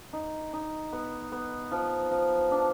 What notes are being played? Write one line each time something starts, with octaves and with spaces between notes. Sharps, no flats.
D#4
D#4
B3
B3
F3
F3
D4